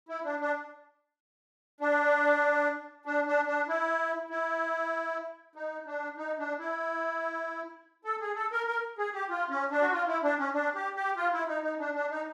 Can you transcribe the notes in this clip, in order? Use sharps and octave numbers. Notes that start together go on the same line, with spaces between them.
E4
D4
D4
D4
D4
D4
D4
E4
E4
D#4
D4
D#4
D4
E4
A4
G#4
A4
A#4
A#4
G#4
G4
F4
C#4
D4
F#4
F4
E4
D4
C#4
D4
G4
G4
F4
E4
D#4
D#4
D4
D4
D#4